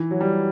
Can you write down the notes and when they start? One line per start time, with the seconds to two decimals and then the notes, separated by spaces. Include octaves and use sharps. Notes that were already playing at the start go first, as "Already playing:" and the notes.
Already playing: E3
0.11 F#3
0.21 G3